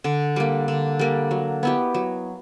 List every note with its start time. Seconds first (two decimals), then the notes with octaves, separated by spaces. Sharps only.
0.04 D3
0.36 G3 A#3
0.68 D3
0.99 G3 A#3
1.31 F#3
1.63 B3 E4 G4
1.94 F#3